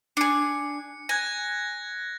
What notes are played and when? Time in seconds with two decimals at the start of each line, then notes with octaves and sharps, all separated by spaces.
0.17 D4 G#4 C#7
1.09 G#5 F#6 G#6 A#6